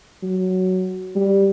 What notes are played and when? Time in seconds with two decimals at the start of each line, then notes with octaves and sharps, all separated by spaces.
0.23 F#3
1.16 G3